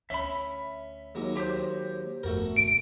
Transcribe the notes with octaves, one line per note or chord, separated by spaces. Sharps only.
D2 C#4 E5 B5
D#2 F#3 G#3
G4 C5
G1 F2 A3 F#4 A#4
E1 D2 D7